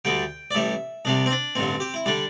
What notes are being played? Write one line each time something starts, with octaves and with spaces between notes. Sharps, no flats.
D2 D3 G3 G5
D5
A1 A2 G3 E5
C2 C3 G3 D4
C4
D4
A1 G2 D3 C4
G4
E4
D3 G3 D4